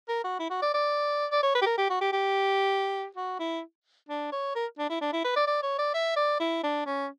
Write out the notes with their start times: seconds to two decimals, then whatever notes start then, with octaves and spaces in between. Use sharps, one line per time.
0.09 A#4
0.24 F#4
0.39 E4
0.50 F#4
0.62 D5
0.74 D5
1.32 D5
1.43 C#5
1.55 B4
1.62 G4
1.66 A#4
1.78 G4
1.90 F#4
2.01 G4
2.13 G4
3.16 F#4
3.40 E4
4.09 D4
4.32 C#5
4.56 A#4
4.79 D4
4.90 E4
5.01 D4
5.13 E4
5.25 B4
5.36 D5
5.47 D5
5.63 C#5
5.79 D5
5.94 E5
6.16 D5
6.40 E4
6.64 D4
6.86 C#4